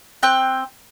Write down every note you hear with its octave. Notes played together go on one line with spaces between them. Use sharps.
C4 G5 F#6